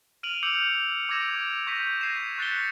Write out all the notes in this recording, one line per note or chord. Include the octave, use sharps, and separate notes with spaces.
F6 D7 D#7 F7 F#7
D6 E6 G6 C#7 F7 F#7
D6 E6 G#6 A#6 D7 E7
C#6 G6 A#6 B6 D#7
G#6 A#6 C7 D#7 E7
C#6 F#6 A6 B6 C#7 G7